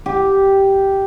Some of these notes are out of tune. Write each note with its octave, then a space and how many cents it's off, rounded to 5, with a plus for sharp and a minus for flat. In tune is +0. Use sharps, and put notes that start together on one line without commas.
G4 -5